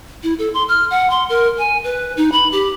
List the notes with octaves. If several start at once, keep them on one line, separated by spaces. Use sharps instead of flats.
E4
A4
C6
F6
F#5
C6
A#4
G#5
B4
D#4
B5
G4